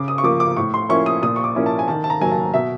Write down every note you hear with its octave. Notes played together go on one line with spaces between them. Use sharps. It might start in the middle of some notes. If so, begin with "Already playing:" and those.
Already playing: C#3 D6
D#6
C#6
F3 A#3 D6
D6
A2 C#6
C6
F3 A#3 C#4 E4 C#6
D#6
A#2 D#6
C#6
D6
F3 A#3 C#4 E4
A5
G#5
D#3 A5
A5
A#5
F#3 A#3 G#5
A5
B2 E5